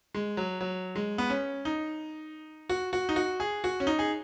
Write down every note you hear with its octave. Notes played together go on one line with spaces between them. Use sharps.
G#3
F#3
F#3
G#3
B3
C#4
D#4
F#4
F#4
D#4
F#4
G#4
F#4
C#4
D#4
G#4